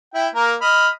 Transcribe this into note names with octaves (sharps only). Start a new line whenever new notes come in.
E4 G5
A#3 A#4
D#5 B5 F6